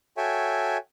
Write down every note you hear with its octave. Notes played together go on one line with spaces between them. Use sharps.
F#4 A4 C#5 E5 G5 G#5